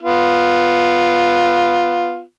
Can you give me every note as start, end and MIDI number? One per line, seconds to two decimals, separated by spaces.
0.03 2.21 59
0.03 2.21 65